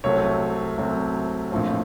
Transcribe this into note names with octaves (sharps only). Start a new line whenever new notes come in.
C2 C3 F#3 A3 C4 C#5
C2 C3 F#3 A3 C4
A#1 A2 F3 C4